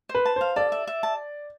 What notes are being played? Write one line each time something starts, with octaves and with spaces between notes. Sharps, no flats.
C5
B4
A5
C5 F5
A4 D5
E5
E5
A5